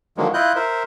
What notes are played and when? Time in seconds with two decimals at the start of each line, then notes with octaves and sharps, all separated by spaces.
0.17 D3 D#3 F3 F#3 G#3 A#3
0.34 E4 F4 D#5 F#6 G6
0.56 A#4 C5 E5